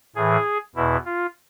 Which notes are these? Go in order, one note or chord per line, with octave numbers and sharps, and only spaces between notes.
A2 E3 G#4
E2 B2 E4
F4